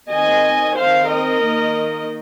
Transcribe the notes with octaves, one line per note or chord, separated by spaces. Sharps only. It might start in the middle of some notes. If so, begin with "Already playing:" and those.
D#3 C4 D#5 G#5
D#3 C4 C5 F5
A#4 D#5
D#3 A#3